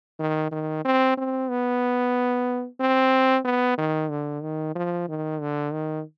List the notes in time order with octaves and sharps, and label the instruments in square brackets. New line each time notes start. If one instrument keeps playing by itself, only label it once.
[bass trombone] D#3
D#3
C4
C4
B3
C4
B3
D#3
D3
D#3
F3
D#3
D3
D#3